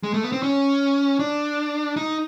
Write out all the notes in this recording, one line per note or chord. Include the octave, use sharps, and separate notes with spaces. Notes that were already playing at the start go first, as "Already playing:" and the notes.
G#3
A3
B3
C4
C#4
D4
D#4